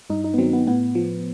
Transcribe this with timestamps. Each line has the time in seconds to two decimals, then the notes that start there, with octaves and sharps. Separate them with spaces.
0.10 G2 D#4
0.24 D#4
0.34 B3
0.38 D#3 F#3 C4
0.53 B3
0.67 A2 B3
0.95 F3